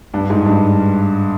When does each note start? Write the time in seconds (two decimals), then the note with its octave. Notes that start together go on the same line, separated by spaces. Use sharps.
0.14 G2
0.30 G#2
0.46 G2